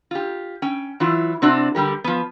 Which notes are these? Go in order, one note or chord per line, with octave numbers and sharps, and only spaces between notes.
F4 G4
C#4 G5
E3 F#3 E4 F4
C3 C4 D4 F#4
D3 G3 G4 A#4
F3 B3